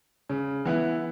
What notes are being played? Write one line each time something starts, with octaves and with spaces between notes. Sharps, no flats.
C#3
E3 B3 E4